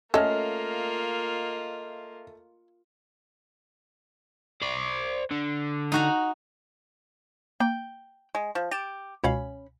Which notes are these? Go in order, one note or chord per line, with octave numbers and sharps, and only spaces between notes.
A3 A#3 C#4 F4 A4 D#5 F6
C5 D5
D3
D#4 F#4 A#5
A#3 G5
G#3
F3
G4 A6 D7 E7
C#2 B2 C#4 F5 B5